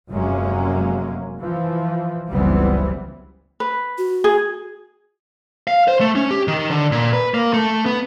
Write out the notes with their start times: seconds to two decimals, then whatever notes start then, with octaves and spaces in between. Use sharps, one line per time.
0.10 F1 F#2 F#3 G#3 A#3 C#4
1.39 E3 F3
2.30 F#1 C#2 E3 G3 B3 C4
3.60 B4
3.98 F#4
4.24 G#4
5.68 F5
5.88 C5
6.00 A3
6.15 C#4
6.31 G4
6.48 D#3
6.71 D3
6.92 A#2
7.13 B4
7.34 A#3
7.53 A3
7.86 B3